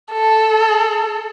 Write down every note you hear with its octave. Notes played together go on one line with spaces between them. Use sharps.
A4